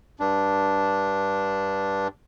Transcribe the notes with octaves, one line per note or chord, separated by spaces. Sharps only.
G2 D4